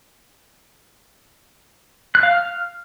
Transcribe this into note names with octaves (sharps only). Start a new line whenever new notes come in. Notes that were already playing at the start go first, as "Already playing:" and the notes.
F#6
F5
F6